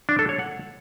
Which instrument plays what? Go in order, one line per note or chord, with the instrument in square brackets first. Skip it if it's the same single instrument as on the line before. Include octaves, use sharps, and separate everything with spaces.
[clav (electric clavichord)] D4
A4
C#5
F#5